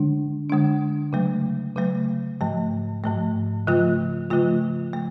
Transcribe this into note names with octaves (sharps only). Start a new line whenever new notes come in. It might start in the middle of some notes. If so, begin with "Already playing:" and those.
Already playing: D3 G#3 D4
D3 G#3 D4
C#3 F#3 A3
C#3 F#3 A3
G#2 F3 A3
G#2 F3 A3
C#3 F3 A3 F4
C#3 F3 A3 F4
A3